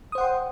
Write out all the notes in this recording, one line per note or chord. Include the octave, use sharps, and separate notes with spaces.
C5 F#5 G5 C6 D#6